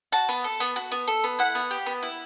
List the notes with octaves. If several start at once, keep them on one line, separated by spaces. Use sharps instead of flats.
F#4 A5
B3
A4
B3
F#4
B3
A4
B3
E4 F#5
B3
G4
B3
E4